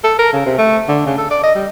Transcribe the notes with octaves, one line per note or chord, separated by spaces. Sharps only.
A4
A#4
C#3
C3
A3
D3
C#3
A4
D5
D#5
G3